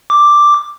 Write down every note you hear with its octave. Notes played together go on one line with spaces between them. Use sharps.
D6